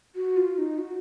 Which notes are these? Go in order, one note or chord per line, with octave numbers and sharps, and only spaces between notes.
F#4
F4
D#4
F#4